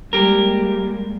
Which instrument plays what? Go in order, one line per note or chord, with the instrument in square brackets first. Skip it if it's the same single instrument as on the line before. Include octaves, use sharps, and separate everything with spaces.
[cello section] G3 G#3 A#3 [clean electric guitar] G4 A#4